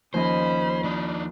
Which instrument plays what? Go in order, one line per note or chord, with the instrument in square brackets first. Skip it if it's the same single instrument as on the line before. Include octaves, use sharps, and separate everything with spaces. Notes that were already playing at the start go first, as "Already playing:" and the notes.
[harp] D#2 F3 D#5 [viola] C#4 B5 [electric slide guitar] C5
[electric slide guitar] D4 D#4 [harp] F6